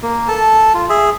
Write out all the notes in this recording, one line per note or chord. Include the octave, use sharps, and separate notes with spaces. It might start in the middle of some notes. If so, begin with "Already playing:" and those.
A#3
A4 A5
F4
G#4 E5